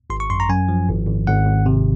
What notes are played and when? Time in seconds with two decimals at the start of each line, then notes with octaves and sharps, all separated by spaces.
0.10 G#1 C6
0.20 C#6
0.30 F#2 C6
0.40 A#5
0.49 F#2 G#5
0.68 F3
0.88 G#1
1.07 G#1
1.27 G#1 F#5
1.46 G#1
1.66 C3